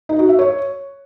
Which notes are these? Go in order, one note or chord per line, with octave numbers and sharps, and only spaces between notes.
D#4
F#4
E5
C#5